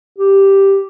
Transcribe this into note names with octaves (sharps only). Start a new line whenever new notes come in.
G4